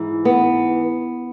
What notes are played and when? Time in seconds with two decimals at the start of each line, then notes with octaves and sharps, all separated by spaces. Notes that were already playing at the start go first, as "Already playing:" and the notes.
Already playing: G#2 E3
0.25 B3